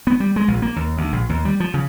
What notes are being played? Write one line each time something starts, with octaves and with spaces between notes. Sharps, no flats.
B3
G3
G#3
A#1
A#3
D#2
D2
A#1
D#2
G3
F3
C#3